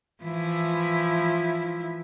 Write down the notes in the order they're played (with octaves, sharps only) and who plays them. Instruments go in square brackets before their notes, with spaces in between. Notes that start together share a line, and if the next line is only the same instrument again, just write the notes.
[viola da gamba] E3 F3 E4